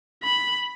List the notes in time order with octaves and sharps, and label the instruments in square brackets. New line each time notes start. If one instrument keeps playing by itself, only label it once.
[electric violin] B5